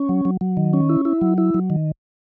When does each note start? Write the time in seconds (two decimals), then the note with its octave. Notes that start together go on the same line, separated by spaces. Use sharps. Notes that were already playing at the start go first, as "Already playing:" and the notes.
Already playing: C#4
0.09 F#3
0.25 F#3
0.41 F#3
0.57 D#3
0.73 C#4
0.89 E4
1.05 E4
1.21 F#3
1.38 E4
1.54 F#3
1.70 D#3